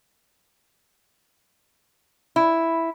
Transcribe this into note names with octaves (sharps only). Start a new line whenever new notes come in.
E4